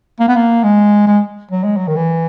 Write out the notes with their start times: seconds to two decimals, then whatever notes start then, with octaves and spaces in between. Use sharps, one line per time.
0.20 A#3
0.28 B3
0.36 A#3
0.64 G#3
1.07 G#3
1.51 F#3
1.64 G#3
1.77 F#3
1.87 D#3
1.96 E3